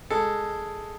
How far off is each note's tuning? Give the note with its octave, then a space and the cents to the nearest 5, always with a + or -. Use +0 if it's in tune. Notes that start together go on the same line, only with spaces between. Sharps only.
G#3 +0 A4 +0